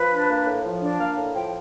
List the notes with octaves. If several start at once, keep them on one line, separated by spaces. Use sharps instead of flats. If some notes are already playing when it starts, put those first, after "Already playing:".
Already playing: F3 B4
D4
A#3
A2
F3
D4
A#3 F5
A2
F3 G5